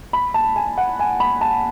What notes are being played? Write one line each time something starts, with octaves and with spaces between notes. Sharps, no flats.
B5
A5
G#5
F#5
G#5
B5
A5